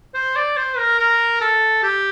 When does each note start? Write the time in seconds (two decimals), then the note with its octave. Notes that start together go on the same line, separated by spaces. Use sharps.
0.14 C5
0.36 D5
0.57 C5
0.78 A#4
0.99 A#4
1.41 A4
1.83 G4